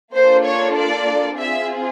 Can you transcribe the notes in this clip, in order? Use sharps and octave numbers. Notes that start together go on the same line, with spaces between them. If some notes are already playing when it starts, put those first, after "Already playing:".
A#3 D4 F4 A4 C5
C#5
D5
C4 F4 G#4 E5